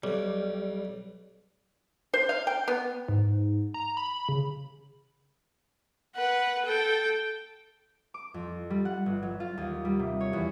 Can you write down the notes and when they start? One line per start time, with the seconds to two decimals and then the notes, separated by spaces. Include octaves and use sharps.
0.03 B1 G3
2.14 C5
2.29 F5
2.47 G5
2.68 B3
3.08 G#2
3.74 A#5
3.97 B5
4.28 C#3
6.16 B4 F#5
6.65 A4 G5
8.14 D6
8.34 F2
8.70 G3
8.85 F#5
9.06 G1
9.23 F#3
9.40 F4
9.58 D#2
9.85 G3
9.99 C3
10.20 C#5
10.33 E2